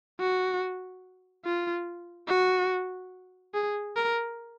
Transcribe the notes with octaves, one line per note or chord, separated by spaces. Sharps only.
F#4
F4
F#4
G#4
A#4